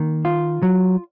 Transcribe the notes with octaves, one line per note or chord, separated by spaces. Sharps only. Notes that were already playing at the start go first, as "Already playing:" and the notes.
Already playing: D#3 A#3
F4
F#3